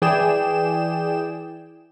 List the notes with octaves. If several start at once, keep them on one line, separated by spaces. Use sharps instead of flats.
E3 G#4 D5 G5 E7